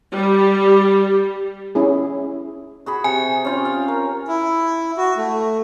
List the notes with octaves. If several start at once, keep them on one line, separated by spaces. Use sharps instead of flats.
G3
C#4 E4 G#4
F#4 G#4 B5
C3 G#5
C#4 F4 G5
F5
A#4
E4
F#4
A3